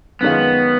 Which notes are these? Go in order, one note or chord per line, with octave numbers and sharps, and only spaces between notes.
F#2 D#3 G#3 B3 C#4 F4